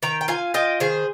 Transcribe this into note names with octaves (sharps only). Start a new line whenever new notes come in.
D#3 G5 A#5
G5
F4 F5 G#5
F4 D#5 G5
D#3 G#4 C5